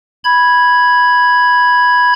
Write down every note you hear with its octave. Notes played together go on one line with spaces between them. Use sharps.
B5 G#6